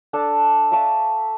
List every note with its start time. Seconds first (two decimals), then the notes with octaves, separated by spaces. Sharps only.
0.13 D4 A4 A5
0.71 E5 F5 A5 C#6